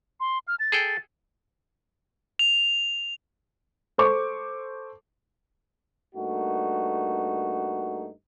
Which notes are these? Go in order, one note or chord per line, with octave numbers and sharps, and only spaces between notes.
C6
F6
A6
G#4 A4 G5
F7
A4 C5 C#6 D6
G2 A3 A#3 D#4 F#4